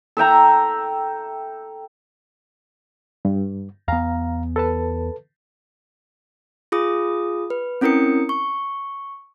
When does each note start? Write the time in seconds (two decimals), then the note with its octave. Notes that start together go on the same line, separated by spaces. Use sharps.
0.17 A4 E5 G5 A#5
3.25 G2
3.88 E2 B3 F5 A#5
4.56 A4 B4 A5
6.72 F4 G#4 D#6
7.50 B4
7.81 C4 C#4 E4 A#4 D#6 C#7
8.29 C#6